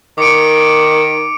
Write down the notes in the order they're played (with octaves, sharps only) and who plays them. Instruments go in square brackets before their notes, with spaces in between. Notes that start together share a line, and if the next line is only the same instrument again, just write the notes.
[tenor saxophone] D#3 [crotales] D6 C#7 D7